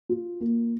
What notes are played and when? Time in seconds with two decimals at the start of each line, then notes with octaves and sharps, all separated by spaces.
0.09 F4
0.40 A#3